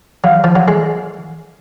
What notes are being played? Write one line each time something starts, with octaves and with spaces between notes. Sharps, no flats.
F#3 F5
F3
F#3
G#3